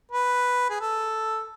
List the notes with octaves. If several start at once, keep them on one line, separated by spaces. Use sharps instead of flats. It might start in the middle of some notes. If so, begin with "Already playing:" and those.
B4
G#4
A4